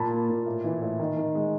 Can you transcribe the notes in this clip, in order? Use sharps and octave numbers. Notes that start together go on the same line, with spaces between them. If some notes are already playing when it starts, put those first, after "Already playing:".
Already playing: A#2 A5 B5
A#3
A#2
A2
E3
A2
D#3
D#3
G#3